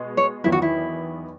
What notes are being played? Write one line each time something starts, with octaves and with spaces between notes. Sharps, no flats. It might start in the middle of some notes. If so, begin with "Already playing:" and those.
Already playing: B2 G#3 B3
C#5
E2 D#3 F#3 B3 E4
F#4
E4